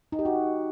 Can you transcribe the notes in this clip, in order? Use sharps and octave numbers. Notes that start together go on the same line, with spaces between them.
D#4
G4
F#4